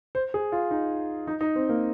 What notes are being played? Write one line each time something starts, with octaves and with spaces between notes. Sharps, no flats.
C5
G#4
F4
D#4
D#4
D#4
C4
A#3